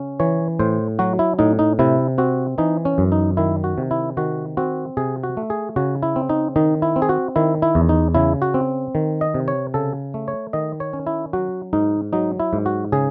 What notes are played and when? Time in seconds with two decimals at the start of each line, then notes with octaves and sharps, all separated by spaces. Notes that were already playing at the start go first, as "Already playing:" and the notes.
Already playing: C#3 C#4
0.20 E3 C#5
0.59 A2 C5
0.99 F#3 F#4
1.19 E4
1.39 A2 D#4
1.59 D#4
1.79 C3 E4
2.18 C4 F#4
2.58 E3 D#4
2.85 C#4
2.98 F#2
3.12 D#4
3.37 D#3 E4
3.64 F#4
3.78 C3
3.91 E4
4.17 D#3 F#4
4.57 C4 F#4
4.97 C3 G#4
5.24 F#4
5.37 A3
5.50 G#4
5.76 C#3 F#4
6.03 E4
6.16 C4
6.29 D#4
6.56 D#3 D#4
6.82 E4
6.96 C4
7.02 G#4
7.09 F#4
7.36 D#3 E4
7.62 E4
7.75 E2
7.89 D#4
8.15 C#3 E4
8.42 F#4
8.54 C4
8.95 D#3
9.21 D#5
9.34 C3
9.48 C#5
9.74 C#3 A4
10.14 A3
10.28 C#5
10.53 D#3 D#5
10.80 C#5
10.93 C#4
11.07 E4
11.33 F#3 F#4
11.73 G#2 D#4
12.13 F#3 D#4
12.40 E4
12.53 G#2
12.66 F#4
12.92 C#3 G#4